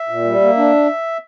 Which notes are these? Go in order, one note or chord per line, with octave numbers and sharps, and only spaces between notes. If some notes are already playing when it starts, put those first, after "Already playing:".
Already playing: E5
A#2
G3
A#3
D4